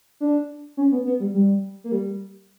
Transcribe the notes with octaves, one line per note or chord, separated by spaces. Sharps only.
D4
C#4
B3
B3
G3
G3
A#3
G3